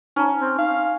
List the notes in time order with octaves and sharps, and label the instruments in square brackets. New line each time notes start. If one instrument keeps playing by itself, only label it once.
[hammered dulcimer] C#4 [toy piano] D#4 A5 A#5
[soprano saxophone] C4
[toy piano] D#4 [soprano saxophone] F5